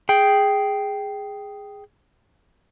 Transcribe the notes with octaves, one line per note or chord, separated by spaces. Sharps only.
G#4 G5